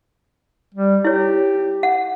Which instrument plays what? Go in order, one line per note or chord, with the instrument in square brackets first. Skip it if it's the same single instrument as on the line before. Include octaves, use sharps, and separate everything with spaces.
[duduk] G3
[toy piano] E4 C#5 [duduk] G4
[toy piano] F#5